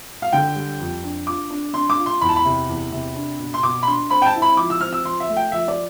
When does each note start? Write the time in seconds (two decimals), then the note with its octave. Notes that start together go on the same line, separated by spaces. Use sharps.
0.22 F5
0.32 D3 G5
0.56 G3
0.80 F2
1.04 D4
1.27 F4 D6
1.50 D4
1.74 D4 C6
1.90 D6
1.98 F4
2.06 C6
2.21 E2 B5
2.29 A5
2.36 B5
2.45 C3
2.69 E2
2.92 C3
3.16 D4
3.40 B2
3.54 C6
3.63 B2 D6
3.83 B5
3.87 D4 C6
4.10 C4 B5
4.22 G5
4.26 A5
4.35 E4
4.42 B5
4.57 F3 D6
4.70 E6
4.81 C4 F6
4.93 E6
5.05 F3 C6
5.20 E5
5.29 A3
5.37 G5
5.52 F3 E5
5.68 D5